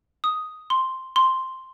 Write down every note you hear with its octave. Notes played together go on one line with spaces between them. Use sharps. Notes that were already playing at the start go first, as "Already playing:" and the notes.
D#6
C6
C6